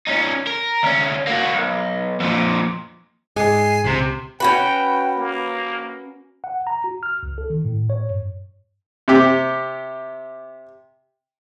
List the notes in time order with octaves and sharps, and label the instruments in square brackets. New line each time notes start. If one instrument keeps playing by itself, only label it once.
[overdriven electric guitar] C#4 D#4
A#4
D2 C#4
A#3 F#4
B1
F2 A#2
[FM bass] G#2 [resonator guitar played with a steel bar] G#3 [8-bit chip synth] G#5 C7
[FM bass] C#2 [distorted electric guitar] C3
[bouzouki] C#4 F#4 B4 [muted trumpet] G5
[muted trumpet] A#3
[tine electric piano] F#5
A#5
F#4
F6
C#2
A4
D#3
A2
C#5
G2
[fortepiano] C3 G4